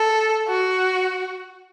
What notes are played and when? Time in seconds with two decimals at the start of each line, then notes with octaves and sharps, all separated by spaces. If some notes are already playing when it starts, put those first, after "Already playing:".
Already playing: A4
0.48 F#4